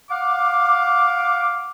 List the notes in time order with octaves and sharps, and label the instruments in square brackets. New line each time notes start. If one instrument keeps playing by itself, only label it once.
[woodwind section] F5 F#5 D6